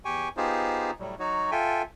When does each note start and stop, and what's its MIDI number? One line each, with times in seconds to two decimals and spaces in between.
0.05 0.28 40
0.05 0.28 67
0.05 0.28 79
0.05 0.28 80
0.05 0.28 85
0.37 0.91 59
0.37 0.91 63
0.37 0.91 65
0.37 0.91 67
0.37 0.91 68
0.37 0.91 72
0.99 1.15 45
0.99 1.15 54
0.99 1.15 55
1.19 1.51 54
1.19 1.51 63
1.19 1.51 66
1.19 1.51 73
1.51 1.82 65
1.51 1.82 69
1.51 1.82 76
1.51 1.82 79
1.51 1.82 80